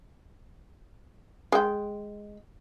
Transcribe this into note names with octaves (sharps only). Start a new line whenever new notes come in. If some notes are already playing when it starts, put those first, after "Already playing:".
G#3 G5